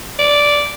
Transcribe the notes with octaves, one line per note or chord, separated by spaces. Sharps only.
D5